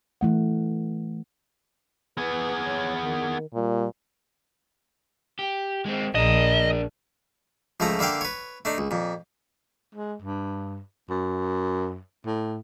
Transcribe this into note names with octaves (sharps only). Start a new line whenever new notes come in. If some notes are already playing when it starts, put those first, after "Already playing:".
E3 A3 F#5
B3 G#4 B4
C#5
D#3
A#2 G3
G4
G#3 C4
A#1 D4 A#4 D#5
C#2 F3 A3 E4 A#5
D3 A#3 E5 F5 G5
B4 C#5
A3 D4 D#4
C#2
F2 A#2
G#3
G2
F#2
A2